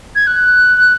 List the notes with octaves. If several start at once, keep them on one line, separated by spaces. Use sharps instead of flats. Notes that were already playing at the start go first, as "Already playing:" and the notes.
G#6
F#6